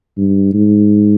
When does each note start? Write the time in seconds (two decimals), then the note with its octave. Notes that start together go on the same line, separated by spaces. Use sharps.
0.17 G2
0.53 G#2